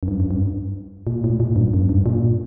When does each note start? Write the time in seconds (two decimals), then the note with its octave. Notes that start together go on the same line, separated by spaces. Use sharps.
0.03 F#2
0.08 G2
0.20 F#2
0.31 G2
1.07 A#2
1.24 A2
1.40 A#2
1.56 G2
1.74 F#2
1.89 G2
2.06 A#2